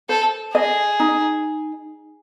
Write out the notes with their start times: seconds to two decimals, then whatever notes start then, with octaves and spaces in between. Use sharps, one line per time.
0.09 A4 C5
0.55 G#4 D#5
1.00 D#4